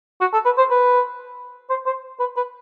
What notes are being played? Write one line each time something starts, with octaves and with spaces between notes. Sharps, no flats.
F#4
A4
B4
C5
B4
C5
C5
B4
B4